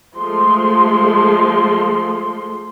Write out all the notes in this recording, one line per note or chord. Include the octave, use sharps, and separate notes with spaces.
F3 G#3 A3 C6